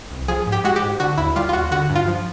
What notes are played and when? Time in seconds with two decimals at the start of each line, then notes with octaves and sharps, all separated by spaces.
0.11 C2
0.28 F3 G#4
0.46 G#2
0.52 G4
0.64 G#3 F#4
0.76 G4
0.82 G#2
1.00 D3 F#4
1.17 D#2 E4
1.36 G3 F4
1.49 F4
1.53 D#2 F#4
1.71 D3 F#4
1.90 G2
1.95 F4
2.07 F3